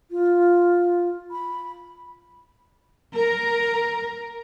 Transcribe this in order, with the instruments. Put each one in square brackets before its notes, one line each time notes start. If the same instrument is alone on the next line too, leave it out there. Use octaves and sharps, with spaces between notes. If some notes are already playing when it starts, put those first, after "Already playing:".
[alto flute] F4
B5
[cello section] A#4